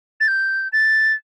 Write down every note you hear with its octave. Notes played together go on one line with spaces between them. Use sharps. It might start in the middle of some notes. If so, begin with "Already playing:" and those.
A6
G6
A6